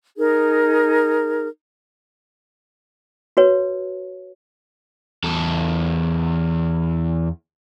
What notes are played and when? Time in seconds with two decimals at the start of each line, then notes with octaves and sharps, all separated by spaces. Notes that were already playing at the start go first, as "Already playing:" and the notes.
0.17 D#4 G#4 A#4
3.37 F#4 B4 C#5
5.24 E2 A4